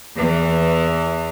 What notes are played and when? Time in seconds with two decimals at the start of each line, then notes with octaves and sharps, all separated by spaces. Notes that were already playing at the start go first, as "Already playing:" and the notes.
0.16 E2 E3